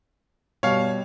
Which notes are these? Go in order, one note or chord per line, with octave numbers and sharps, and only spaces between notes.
B2 G3 C#5 F5